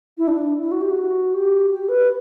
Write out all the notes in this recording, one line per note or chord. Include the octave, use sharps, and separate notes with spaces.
E4
D4
E4
F#4
G4
F#4
G4
G4
B4